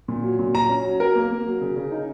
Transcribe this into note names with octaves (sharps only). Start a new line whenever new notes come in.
A#2
F#3
A#2
F#3 A#5
C#4
F#3
F#3 A#4
A#3
A#3
F#3
C#3
C#3
D#4